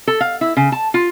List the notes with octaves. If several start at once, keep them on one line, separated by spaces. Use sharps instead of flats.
A4
F5
E4
C#3
A5
F4